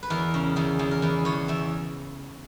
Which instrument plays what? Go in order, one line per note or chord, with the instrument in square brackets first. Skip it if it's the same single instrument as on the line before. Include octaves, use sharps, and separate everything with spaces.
[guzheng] B4
E2 A#4
C#3
E2 G#4
E2
A#4
E2 B4
E2 C#5
E2 E5